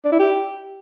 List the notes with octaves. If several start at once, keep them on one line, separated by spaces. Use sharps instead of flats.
D4
E4
G4